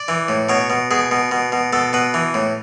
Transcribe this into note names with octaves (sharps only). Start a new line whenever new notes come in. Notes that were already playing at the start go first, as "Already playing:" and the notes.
Already playing: D5
E3
A2
B2 C#5
B2
B2 G#4
B2
B2
B2
B2 A4
B2 B4
E3
A2